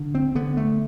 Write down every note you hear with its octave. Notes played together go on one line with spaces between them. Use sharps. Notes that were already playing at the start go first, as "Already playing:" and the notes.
Already playing: D3
C4
D3 B3
A3